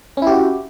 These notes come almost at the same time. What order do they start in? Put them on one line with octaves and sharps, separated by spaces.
C#4 E4 G4 F#4